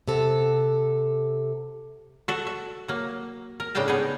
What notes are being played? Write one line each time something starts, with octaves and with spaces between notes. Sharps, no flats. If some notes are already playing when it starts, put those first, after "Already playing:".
C3 A4 F#5
F#4 A4
E5
F#3 A#3
A#4
A2 C#3 D4 F5 G5 A5
B3 D#4 G#4